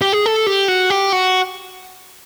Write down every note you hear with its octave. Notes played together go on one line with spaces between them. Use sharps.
G4
G#4
A4
G4
F#4
G4
F#4